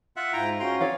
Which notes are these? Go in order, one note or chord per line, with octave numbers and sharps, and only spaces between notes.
F4 E5 F#5
G#2 E4 F4 G5 A#5
C#4 F4 F#4 G5 A#5 C6
C4 C#5 D5 F5